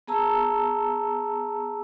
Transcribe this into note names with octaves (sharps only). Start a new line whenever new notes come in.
B3 G#4 A5 A#5 E6